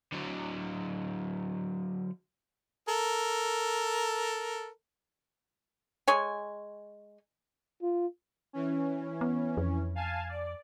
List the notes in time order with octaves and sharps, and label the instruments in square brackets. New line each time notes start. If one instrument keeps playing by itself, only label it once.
[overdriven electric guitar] D3 F#3
[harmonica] A4 A#4
[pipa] G#3 C#5 G#5
[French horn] F4
[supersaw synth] E3 C#4
[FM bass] B3
F2
[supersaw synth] F5 G#5 A5
D5